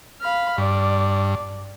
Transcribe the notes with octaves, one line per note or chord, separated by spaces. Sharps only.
F5 B5 F6
G2 D5